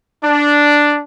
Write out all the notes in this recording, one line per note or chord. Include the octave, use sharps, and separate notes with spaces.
D4